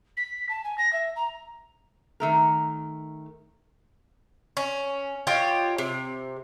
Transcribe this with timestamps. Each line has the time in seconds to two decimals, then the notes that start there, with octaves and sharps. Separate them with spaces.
0.17 B6
0.49 A5
0.64 G#5
0.78 A#6
0.93 E5
1.16 A#5
2.20 D#3 A3 A#4
4.57 C#4
5.27 F4 G4 C#5 D#5
5.78 C3